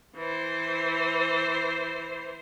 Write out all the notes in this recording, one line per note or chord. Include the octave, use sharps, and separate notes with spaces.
E3 C5